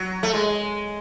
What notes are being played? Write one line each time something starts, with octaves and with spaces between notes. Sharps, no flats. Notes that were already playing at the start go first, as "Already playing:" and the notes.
Already playing: F#3
A3
G#3